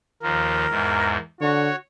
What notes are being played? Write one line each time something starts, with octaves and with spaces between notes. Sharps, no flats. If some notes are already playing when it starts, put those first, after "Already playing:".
D#2 F3 A#4
E2 G#2
D3 F#4 C#5